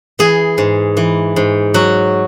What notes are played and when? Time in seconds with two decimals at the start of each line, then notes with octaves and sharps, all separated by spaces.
0.19 E3 G#4
0.58 G#2
0.97 E3
1.36 G#2
1.74 F#3 F#4